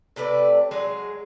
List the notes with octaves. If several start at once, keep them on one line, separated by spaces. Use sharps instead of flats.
C3 A3 B4 D5
F#3 G#3 G#4 D#5